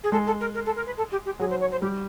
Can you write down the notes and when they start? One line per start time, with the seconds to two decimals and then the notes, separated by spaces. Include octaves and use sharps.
0.03 G#4
0.12 G#3 A4
0.26 A4
0.40 A#4
0.54 A#4
0.65 A4
0.76 A#4
0.86 B4
0.97 A4
1.11 G4
1.25 G4
1.39 F#3 G#4
1.50 C5
1.60 C#5
1.71 C5
1.81 G3 G4